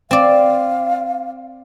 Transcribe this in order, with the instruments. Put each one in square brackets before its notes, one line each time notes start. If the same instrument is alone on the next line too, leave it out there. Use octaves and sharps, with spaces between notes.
[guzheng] C4 D5 [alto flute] F5